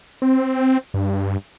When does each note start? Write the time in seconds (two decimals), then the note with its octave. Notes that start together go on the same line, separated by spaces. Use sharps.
0.22 C4
0.94 G2